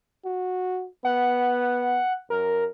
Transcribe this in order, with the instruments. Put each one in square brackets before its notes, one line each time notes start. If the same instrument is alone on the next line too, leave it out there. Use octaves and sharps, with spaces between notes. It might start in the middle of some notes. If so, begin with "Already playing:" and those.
[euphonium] F#4
[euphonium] B3 [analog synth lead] F#5
[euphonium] F#2 [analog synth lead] A#4